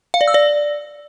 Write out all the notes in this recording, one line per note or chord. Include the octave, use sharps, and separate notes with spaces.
F5
D5
E6
D5